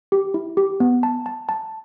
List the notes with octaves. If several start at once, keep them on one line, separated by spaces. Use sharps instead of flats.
G4
E4
G4
B3
A5
A5
A5